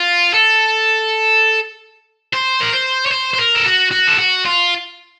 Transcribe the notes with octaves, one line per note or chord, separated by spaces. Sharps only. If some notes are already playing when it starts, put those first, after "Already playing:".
Already playing: F4
A4
C5
A#4
C5
C#5
C5
C5
A#4
A4
F#4
F#4
A4
F#4
F4